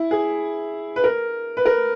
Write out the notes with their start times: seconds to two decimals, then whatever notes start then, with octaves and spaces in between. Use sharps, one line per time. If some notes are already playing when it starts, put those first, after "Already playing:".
Already playing: E4
0.11 G#4
0.96 B4
1.04 A#4
1.57 B4
1.66 A#4